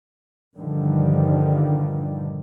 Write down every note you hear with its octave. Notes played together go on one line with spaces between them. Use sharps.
A#1 G2 D3 D#3 F3 G3